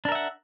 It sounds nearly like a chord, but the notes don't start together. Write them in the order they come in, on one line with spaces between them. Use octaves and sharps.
D4 A#4 E5 F#5